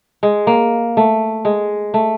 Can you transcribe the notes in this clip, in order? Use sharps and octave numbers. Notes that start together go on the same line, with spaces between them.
G#3
A#3
A3
G#3
A3